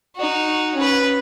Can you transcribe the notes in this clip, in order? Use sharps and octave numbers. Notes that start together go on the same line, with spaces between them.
D#4 F#4
C#4 B4